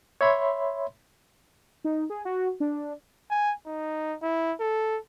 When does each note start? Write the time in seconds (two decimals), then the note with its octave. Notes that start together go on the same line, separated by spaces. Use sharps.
0.21 C#5 E5 B5 C6
1.84 D#4
2.10 G#4
2.25 F#4
2.60 D4
3.31 G#5
3.66 D#4
4.23 E4
4.60 A4